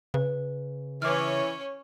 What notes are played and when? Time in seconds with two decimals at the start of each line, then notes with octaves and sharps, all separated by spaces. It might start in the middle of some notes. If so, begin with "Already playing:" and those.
0.14 C#3 B4
1.02 E3 C#4 C#5 D6 F6